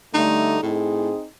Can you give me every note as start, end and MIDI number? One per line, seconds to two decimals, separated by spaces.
0.14 0.57 50
0.14 0.57 55
0.14 0.57 57
0.14 0.60 63
0.62 1.11 45
0.62 1.25 60
0.62 1.25 63
0.62 1.25 68